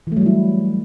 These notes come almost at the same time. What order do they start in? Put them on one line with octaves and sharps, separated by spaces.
E3 A3 F#3 G3 E4